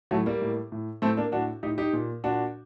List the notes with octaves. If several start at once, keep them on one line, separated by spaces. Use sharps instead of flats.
A2 F#3 A3
G3 A#3
A2
A2
A2 A3 C4
A#3 D4
A2 D4 F#4
A2 D#4 G4
D#4 G4
A#2
A#2 D4 F#4